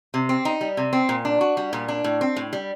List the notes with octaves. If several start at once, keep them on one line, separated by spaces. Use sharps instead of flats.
C3
C4
D#4
G3
C3
C4
A#2
D4
F#4
G3
A#2
D4
A2
C4
A2
G3